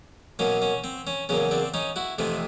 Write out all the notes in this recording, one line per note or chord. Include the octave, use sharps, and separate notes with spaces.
B2 F#3 A#3 C#4
C#4
C4
C#4
E2 C#3 F#3 A#3 C#4
C4 D4
C#4 D#4
E4 F#4
F2 C3 E3 A3 C4